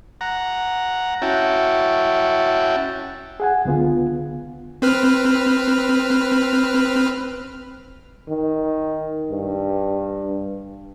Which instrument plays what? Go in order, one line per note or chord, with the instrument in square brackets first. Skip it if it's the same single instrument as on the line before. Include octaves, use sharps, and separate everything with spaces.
[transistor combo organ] F#5 A#5
C#4 E4 F#4 G5 A5
[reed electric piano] G#4 F#5 G#5
C#2 D3 B3 F4
[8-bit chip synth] C4 B4 F6
[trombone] D#3
G2